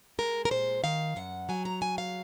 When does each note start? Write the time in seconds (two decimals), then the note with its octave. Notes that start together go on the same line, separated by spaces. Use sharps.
0.19 G#3 A#4
0.45 A#4
0.51 A#2 C5
0.84 D#3 F5
1.16 F#2 F#5
1.49 F#3 G#5
1.65 A#5
1.81 C#3 G#5
1.98 F5